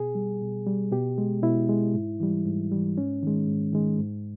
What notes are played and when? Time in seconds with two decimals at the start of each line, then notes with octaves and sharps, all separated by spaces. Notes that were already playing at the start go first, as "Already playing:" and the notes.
Already playing: B2 G#4
0.15 G3
0.41 B2
0.67 G3
0.92 B2 G4
1.18 G#3
1.43 B2 E4
1.69 G#3
1.94 G#2
2.20 E3 G3
2.46 G#2
2.71 E3 G3
2.97 G#2 C#4
3.23 D#3 G#3
3.48 G#2
3.73 D#3 G#3
3.99 G#2